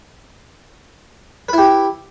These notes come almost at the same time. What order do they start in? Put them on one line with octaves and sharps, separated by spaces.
B4 E4 G4